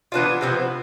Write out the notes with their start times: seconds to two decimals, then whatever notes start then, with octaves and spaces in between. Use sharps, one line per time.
0.12 E3 B3 D4 F4
0.41 C3 F3 B3 E4